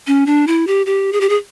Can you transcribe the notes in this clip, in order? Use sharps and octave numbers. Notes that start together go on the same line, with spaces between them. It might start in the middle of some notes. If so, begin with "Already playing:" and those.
C#4
D4
E4
G4
G4
G#4
G4
G#4